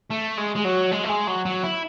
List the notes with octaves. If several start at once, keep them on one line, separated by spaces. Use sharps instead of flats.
A3
G#3
G#3
F#3
G#3
A3
G#3
F#3
F#3
E4